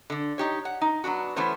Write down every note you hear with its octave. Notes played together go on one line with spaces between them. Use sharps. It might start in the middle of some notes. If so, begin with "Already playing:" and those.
D3 D4
D#4 G4 C#5
F#5
D#4
F#3 B3 D4 F#4
E3 A3 B3 C#4 C5